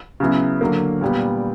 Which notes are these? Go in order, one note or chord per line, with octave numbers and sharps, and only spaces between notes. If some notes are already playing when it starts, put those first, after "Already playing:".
C#3 F#3 B3 E4
D3 F#3 A#3
A#2 G3 B3